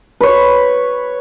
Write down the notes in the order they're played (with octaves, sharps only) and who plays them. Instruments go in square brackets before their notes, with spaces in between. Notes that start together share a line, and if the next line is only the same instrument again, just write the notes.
[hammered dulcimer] B4 C#5